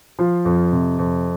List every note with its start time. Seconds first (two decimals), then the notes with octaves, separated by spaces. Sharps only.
0.19 F3 F4
0.45 F2
0.72 C3
0.99 F2